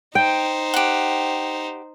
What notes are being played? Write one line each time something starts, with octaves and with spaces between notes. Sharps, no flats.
D#4 C5 G5
G4 F#5